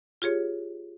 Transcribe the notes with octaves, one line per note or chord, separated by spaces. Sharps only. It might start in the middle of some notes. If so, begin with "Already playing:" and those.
F4 G4 G#4 C#5